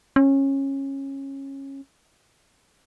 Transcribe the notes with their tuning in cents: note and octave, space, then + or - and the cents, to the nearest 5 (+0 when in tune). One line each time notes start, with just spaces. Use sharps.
C#4 -20